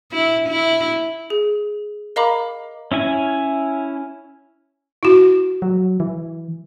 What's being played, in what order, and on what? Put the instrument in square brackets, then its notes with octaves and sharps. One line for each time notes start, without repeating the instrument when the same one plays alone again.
[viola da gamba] E4
E4
[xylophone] G#4
A#4 D#5 F5 A#5 B5 D6
[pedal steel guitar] C#4 E4 G#5
[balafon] E4 F#4
[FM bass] F#3
E3